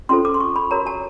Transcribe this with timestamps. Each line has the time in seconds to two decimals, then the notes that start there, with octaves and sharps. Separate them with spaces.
0.09 C#4 F4 A4 C5 C6
0.25 D6
0.34 C6
0.40 C#6
0.56 B5
0.71 F#4 A#4 C#5 A#5
0.87 A5